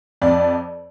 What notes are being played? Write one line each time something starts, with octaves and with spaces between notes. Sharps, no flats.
F2 D5